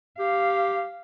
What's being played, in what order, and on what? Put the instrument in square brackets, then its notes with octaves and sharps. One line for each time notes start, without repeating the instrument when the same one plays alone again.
[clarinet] G4 [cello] F5